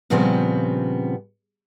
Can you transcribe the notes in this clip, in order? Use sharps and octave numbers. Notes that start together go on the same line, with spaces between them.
A#2 C#3 F3 G3 B3 C4